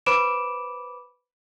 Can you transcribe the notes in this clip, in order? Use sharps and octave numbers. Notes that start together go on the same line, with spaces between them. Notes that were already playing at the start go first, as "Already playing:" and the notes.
B4 C5 B5 D6 D7 E7